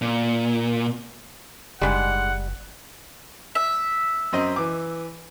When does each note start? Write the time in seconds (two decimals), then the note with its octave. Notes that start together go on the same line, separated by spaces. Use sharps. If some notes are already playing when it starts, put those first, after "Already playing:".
0.02 A#2
1.82 F#1 G#2 C#3 G3 G#3 F#5
3.55 E5
4.33 F#2 C4 D#5
4.56 E3 D6